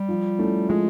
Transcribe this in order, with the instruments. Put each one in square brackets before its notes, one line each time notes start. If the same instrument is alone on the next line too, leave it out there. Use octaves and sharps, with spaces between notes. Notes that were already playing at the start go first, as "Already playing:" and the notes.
Already playing: [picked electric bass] G3
[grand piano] F3
A3 C#4 E4
[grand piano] F3 [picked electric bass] G#3